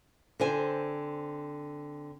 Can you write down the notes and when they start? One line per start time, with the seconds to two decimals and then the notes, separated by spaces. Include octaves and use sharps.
0.40 D3 C4 C5 G#5